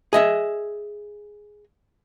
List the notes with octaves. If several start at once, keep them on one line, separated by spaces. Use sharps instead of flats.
G#4 D#5 E5